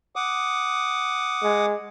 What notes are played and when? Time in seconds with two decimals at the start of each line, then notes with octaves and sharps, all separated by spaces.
0.16 F#5 D6 D#6
1.43 G#3